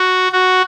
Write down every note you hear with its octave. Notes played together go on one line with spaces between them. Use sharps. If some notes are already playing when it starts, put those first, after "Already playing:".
Already playing: F#4
F#4